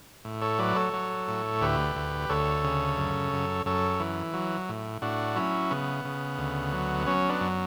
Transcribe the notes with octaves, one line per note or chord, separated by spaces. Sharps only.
A2
A4 C#5
F#3 B4 D5
A4 C#5
F#3
A2
D2 G4 B4
D2
D2 A4 C#5
C#3
F#2
F#2
F#2 A4 C#5
E3
F#3
A2
A2 D4 F#4
F#3 C#4 E4
C#3 B3
C#3
D2
F#3
F#3 C#4
B3 D4
F#2